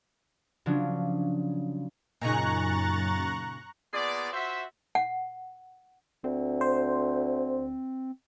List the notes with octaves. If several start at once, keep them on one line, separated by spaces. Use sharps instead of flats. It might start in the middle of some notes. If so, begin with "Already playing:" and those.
C#3 F3 F#3 C#4 D4
F#2 A#2 C#3 D#4 A#5 C#6 F#6 A6
A#2 B3 G#4 D5
F4 F#4 C5 E5
F#5
D2 C4
C5